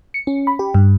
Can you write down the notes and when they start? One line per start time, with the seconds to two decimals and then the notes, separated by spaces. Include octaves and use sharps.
0.14 C#7
0.27 C#4
0.47 B5
0.59 G4
0.74 G2